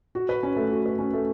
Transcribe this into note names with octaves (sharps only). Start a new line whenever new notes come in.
F#4
B4
C#4
A3
F#4
B4
C#4
A3